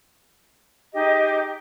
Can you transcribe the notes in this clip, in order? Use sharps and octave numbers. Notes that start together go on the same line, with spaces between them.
D#4 G4 G#4 D#5